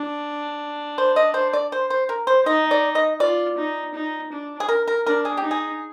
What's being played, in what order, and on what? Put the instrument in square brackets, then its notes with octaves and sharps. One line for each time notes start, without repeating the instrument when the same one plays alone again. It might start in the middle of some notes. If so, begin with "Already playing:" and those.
Already playing: [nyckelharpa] D4
[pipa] C5
D#5
C5
D5
C5
C5
A#4
C5
[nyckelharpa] D#4 [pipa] D#5
[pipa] D5
D#5
[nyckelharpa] F4 [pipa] D5
[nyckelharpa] D#4
D#4
D4
[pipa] G#4
A#4
A#4
[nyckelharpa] D4 [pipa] A#4
[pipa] G#4
G4
[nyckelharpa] D#4
[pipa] G#4